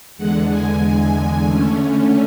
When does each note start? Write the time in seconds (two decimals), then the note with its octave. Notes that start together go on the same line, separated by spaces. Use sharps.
0.18 E2 D3 G#3 F#5
0.50 G#5
0.82 G#5
1.47 D3 A3 C#4